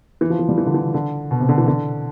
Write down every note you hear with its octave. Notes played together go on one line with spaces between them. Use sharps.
E3
F3
E3
G3
E3
D3
E3
D3
B2
C3
D3
E3
D3